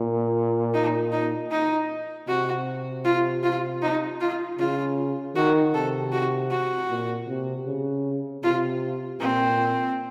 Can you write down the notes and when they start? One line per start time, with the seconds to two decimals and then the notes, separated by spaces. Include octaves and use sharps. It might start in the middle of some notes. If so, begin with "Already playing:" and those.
Already playing: A#2
0.74 D#4
1.12 D#4
1.51 D#4
2.28 C3 F#4
3.05 F4
3.43 F4
3.82 D#4
4.20 F4
4.58 C#3 F4
5.36 D#3 F#4
5.74 C3 A4
6.12 F#4
6.51 F#4
6.90 A#2
7.28 C3
7.66 C#3
8.43 C3 F4
9.20 A#2 C4